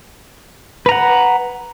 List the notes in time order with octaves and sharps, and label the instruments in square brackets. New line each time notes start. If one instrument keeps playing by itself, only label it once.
[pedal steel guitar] B4
A#5
F#5